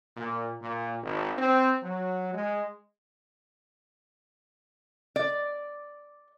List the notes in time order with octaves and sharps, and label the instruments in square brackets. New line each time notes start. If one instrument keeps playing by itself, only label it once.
[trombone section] A#2
A#2
G#1
C4
F#3
G#3
[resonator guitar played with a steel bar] D5